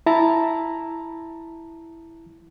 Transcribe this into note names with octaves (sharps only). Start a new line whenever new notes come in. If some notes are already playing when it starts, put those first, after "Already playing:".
E4 A5 A#5